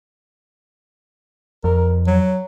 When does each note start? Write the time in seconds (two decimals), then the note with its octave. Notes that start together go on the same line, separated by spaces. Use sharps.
1.64 F2 A#4
2.07 F#3